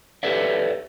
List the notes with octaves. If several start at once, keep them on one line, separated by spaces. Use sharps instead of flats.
G4 A4 B4 C#5 D5 E5